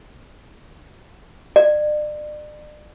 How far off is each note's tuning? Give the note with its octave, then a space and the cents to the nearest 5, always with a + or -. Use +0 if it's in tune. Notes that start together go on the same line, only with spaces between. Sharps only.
D5 +35